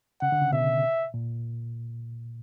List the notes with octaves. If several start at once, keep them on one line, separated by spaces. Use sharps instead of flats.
C#3 F#5
D3
C#3
B2 E5
A#2